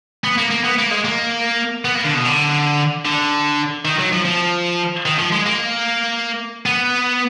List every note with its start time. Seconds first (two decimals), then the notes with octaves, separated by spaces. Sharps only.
0.24 B3
0.38 A#3
0.51 A#3
0.64 B3
0.78 A#3
0.91 G#3
1.05 A#3
1.85 B3
1.95 A#3
2.04 D3
2.15 B2
2.25 D3
3.05 D3
3.85 D#3
3.98 F#3
4.12 F3
4.25 F3
5.06 D#3
5.19 F3
5.32 G#3
5.46 A#3
6.66 B3